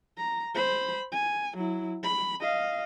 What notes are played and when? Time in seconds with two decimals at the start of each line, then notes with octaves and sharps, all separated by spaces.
0.17 A#5
0.55 C5 B5
1.12 G#5
1.57 F#3 E4
2.03 B5
2.41 D#5 F5